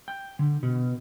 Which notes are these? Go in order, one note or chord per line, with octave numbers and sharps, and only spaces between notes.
G5
D3
B2